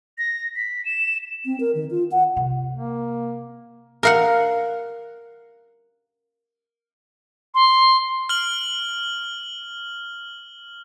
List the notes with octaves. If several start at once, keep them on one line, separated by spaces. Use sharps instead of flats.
A#6
B6
E7
C4
A#4
D#3
F4
F#5
C3
A#3
A#4 F5 F#5
C6
F6 F#7